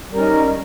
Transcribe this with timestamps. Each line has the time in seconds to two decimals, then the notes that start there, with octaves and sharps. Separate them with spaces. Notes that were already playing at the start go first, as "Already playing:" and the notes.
0.11 G3
0.14 A#4
0.16 C#4
0.19 D#4